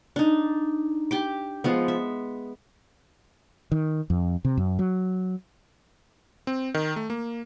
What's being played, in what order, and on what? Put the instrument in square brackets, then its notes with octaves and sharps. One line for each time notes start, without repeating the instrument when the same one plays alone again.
[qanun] D4 D#4
G4 G5 D6
F3 G#3 B3
E5
[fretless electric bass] D#3
F2
C3
F#2
F#3
[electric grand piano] C4
D#3
A3
A#3